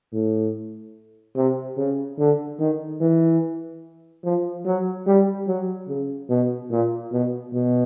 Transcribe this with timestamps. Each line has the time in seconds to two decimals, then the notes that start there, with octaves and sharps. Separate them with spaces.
0.13 A2
1.36 C3
1.77 C#3
2.19 D3
2.59 D#3
3.01 E3
4.23 F3
4.65 F#3
5.06 G3
5.47 F#3
5.88 C#3
6.29 B2
6.70 A#2
7.12 B2
7.53 B2